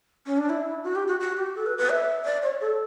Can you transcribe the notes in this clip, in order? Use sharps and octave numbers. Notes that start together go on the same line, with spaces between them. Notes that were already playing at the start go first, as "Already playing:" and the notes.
C#4
D4
E4
F#4
G4
F#4
F#4
G4
A4
B4
B4
E5
D5
C#5
A4